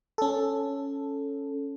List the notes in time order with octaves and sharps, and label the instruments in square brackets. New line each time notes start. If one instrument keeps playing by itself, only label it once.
[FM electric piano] C#4 A4